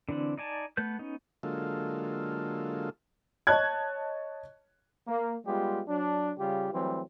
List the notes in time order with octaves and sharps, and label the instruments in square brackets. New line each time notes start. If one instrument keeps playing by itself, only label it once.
[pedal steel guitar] D3 E3 C4 D4
D#4 D5 G#5 A5
A3 B3 B4 G6
B3 C#4 D#4
[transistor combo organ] D3 F#3 G#3 A#3 F4 A4
[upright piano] C#5 D#5 A5 F#6 G#6
[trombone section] A#3
G3 G#3 B3 F4 G4
F#3 D4
C#3 G3 F4 G4
E3 F#3 G3 A3 C4